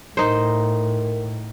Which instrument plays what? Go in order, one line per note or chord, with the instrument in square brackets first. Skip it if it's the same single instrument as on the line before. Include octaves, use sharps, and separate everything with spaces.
[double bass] A2 [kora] D#4 C5 [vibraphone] A#4